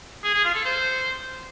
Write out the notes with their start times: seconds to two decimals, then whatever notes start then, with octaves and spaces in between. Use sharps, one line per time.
0.23 G#4
0.34 G#4
0.44 F4
0.54 A4
0.64 C5